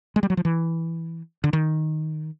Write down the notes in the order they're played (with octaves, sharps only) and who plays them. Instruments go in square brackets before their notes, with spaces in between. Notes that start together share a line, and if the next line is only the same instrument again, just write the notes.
[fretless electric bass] G#3
G3
F#3
F3
E3
D3
D#3